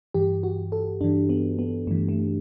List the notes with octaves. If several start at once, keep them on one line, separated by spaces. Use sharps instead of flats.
G2 E3 G4
F#4
A4
G2 E3 D4
B3
B3
G2 E3 A3
A3